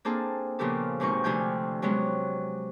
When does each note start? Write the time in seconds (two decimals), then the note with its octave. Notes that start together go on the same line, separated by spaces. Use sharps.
0.05 A#3 C4 D4 G#4 A4
0.59 A#2 C#3 F3 B3 G4 A4
1.00 D#2 G#2 B2 C4 D#4 C#6
1.24 D2 C3 F3 D4 G#5 G6
1.82 C3 F#3 G#3 B3 C#4